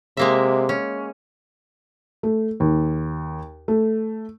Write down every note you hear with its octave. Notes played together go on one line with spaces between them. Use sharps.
C3 G#3 A#3 E5
C#4
A3
D#2
A3